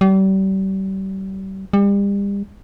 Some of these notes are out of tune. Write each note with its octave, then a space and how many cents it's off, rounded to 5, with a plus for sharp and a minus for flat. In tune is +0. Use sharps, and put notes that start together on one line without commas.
G3 -35
G3 +35